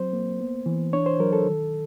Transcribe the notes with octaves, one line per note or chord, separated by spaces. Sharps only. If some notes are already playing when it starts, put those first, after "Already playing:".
Already playing: F#3 C4 C5
A#3
B3
E3
D4 C#5
C5
F#3 A#4
A4
D#3